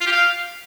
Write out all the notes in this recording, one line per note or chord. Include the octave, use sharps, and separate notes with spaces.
F4
G4
F5